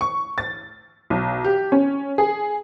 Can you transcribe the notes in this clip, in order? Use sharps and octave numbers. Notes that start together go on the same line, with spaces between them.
C#6
A6
B1
G4
C#4
G#4